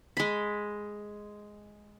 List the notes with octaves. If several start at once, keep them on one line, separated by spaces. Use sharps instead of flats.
G#3 B5